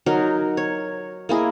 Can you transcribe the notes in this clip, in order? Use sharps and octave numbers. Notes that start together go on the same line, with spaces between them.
F#3 D#4 A#4
C#5
A#3 E4 G#4 D#5